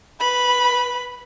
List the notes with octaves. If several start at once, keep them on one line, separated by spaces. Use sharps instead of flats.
B4 B5